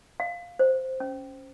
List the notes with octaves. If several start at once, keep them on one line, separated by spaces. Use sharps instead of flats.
F5
C5
C#4